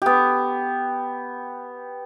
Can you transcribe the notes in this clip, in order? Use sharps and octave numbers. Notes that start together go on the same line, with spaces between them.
B3 G4